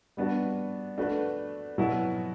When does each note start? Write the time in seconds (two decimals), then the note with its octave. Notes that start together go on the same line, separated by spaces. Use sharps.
0.17 G3 B3 D4 F#4
0.98 A3 D4 F#4 B4
1.78 B2 F#3 B3 E4